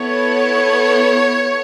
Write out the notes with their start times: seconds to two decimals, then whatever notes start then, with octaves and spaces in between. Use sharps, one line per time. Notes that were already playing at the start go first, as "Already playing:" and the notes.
Already playing: B3 E4 A4 C#5